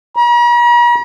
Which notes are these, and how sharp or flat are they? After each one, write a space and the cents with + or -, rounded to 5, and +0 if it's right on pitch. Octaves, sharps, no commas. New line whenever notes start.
A#5 +45